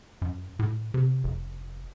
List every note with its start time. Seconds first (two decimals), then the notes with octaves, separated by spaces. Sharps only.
0.22 F#2
0.59 A2
0.94 C3
1.24 F1